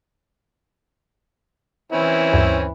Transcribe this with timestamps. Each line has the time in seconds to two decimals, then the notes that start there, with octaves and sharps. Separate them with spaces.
1.92 E3 C4 C#4 E4
2.33 D2 G2